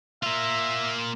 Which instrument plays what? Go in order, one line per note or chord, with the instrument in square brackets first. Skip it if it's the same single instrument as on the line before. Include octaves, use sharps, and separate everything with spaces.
[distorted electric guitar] A#3 F4 [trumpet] E5